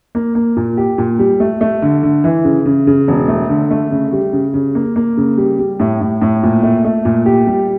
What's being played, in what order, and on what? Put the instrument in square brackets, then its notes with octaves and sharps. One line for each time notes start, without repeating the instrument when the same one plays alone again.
[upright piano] A#3
A#3
A#2
G4
A#2
G3
A3
A3
D3
D3
E3
C#3
C#3
C#3
E1
A3
D3
A3
C#3
G3
C#3
C#3
A#3
A#3
C#3
G3
G3
A2
A2
A2
A#2
A3
A3
A#2
G4
G3